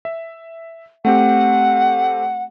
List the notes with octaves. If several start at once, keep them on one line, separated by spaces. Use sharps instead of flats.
E5
A3 C4 G4 F#5